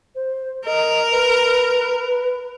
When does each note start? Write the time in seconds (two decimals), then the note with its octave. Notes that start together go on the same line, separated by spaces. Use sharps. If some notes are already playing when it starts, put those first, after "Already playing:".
0.15 C5
0.66 A#4 D#5
1.11 B4